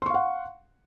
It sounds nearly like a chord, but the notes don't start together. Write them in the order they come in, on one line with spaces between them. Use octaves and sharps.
C6 C#6 F5 F#5